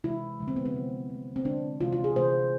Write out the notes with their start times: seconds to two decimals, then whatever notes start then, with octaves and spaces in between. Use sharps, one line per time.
0.04 C3 E3 G#3 E4
0.40 D3 F3 G#3
0.48 C4
0.56 B3
0.66 C4
0.74 C3 F3 A3
1.10 D3 A3
1.36 C4
1.45 D3 G#3 D4
1.81 C3 E3 G#3 F4
1.93 F4
2.04 G#4
2.16 C3 E3 A3 C5